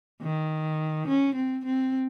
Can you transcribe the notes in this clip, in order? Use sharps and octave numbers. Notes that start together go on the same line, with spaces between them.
D#3
C#4
C4
C4